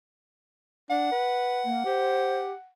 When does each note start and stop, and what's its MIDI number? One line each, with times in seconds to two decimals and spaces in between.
0.90 1.08 62
0.90 2.69 78
1.12 1.67 71
1.65 1.84 58
1.86 2.53 67
1.86 2.39 72